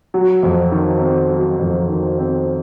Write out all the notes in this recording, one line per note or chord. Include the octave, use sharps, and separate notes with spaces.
F#3
F2
D#3
C4
F#3
F2
D#3
C4